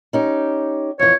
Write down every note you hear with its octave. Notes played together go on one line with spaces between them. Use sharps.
C#4 D#4 G4
F2 E3 C#5